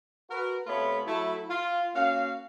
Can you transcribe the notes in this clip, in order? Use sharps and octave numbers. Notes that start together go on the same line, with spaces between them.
F#4 A#4 B4
C3 A3 B3 F4 C#5 B5
F#3 A3 E4
F4
A#3 C#4 F#4 F5